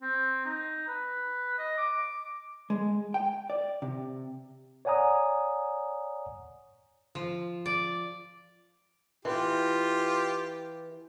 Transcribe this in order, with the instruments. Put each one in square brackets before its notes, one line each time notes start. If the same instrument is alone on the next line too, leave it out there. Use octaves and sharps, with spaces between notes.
[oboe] C4
D#4
B4
D#5
D6
[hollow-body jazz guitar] G#3
G5
D5
C3
[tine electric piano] C#5 D5 F#5 G#5 A#5 D#6
[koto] F3
D5
[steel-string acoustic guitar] E3 [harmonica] F4 G4